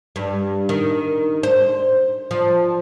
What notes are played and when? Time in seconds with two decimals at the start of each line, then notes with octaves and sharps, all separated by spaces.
0.16 G2
0.69 D#3
1.43 C5
2.31 F3